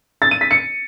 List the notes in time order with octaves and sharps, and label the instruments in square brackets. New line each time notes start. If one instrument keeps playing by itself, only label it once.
[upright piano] A6
D#7
B6
C#7